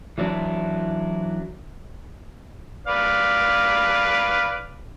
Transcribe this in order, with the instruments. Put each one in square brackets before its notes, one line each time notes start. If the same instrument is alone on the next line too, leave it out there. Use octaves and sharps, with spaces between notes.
[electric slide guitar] E3 F#3 D4 E4
[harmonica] B4 D5 F5